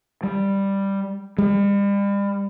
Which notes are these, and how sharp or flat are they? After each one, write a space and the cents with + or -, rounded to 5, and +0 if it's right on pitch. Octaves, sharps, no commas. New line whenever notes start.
G3 +5
G3 +40